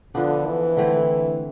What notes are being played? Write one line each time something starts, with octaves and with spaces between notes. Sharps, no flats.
D3 F3 B3 D4
E3
D3 A3 C4 E4